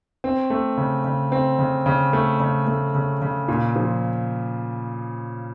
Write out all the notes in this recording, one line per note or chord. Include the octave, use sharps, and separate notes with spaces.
C4
A3
C#3
C#3
C4
C#3
C#3
A3
C#3
A3
C#3
C#3
A#2
F3